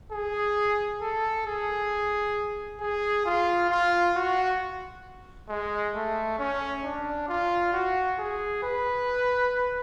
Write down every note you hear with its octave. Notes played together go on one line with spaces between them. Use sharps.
G#4
A4
G#4
G#4
F4
F4
F#4
G#3
A3
C#4
D4
F4
F#4
G#4
B4